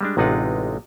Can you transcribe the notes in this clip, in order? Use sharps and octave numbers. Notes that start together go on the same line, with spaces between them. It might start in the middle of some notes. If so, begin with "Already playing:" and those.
G3 G#3 D4
A1 C3 G#3 D#4 F4 F#5